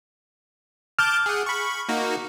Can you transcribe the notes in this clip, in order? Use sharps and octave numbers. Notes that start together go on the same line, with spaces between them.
A5 D6 F6 G6
G#4 F#5
B5 C#6
A#3 D#4 F#4